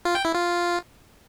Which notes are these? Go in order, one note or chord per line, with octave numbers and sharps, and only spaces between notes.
F4
G5
E4
F4